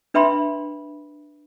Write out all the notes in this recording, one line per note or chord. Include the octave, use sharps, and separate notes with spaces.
D4 B4 E5 G5 B5 C6